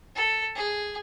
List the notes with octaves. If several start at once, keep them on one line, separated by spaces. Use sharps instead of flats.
A4
G#4